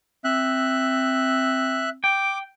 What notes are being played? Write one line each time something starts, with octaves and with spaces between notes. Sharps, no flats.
C4 E5 F#6
G5 D6